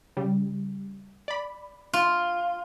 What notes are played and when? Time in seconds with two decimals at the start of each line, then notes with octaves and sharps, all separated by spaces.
0.17 C#3 G3
1.28 D5 B5
1.93 F4